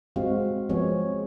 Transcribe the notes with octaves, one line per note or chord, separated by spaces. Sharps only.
G#3 C4 F#4 F5
F3 G#3 B3 C4 G#4 C#5